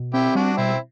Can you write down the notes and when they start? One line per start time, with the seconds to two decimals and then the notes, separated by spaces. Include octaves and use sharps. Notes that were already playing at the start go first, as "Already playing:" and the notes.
Already playing: B2
0.14 C4 E4 G4
0.35 G3 D4 F#4
0.57 B2 C4 E4